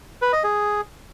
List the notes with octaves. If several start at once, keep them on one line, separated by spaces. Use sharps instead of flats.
B4
D#5
G#4